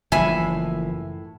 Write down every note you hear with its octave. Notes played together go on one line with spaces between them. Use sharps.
F#1 A2 E3 F3 E5 G#5 B5